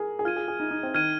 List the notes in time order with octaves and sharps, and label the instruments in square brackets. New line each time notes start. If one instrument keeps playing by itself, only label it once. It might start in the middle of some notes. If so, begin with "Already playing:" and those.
Already playing: [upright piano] G#4 A#4
G#4
[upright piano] F4 [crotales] F6 G#6 D#7
[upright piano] G#4
G#4
D#4
D#4
C4
[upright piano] D#3 [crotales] F6 G#6 D#7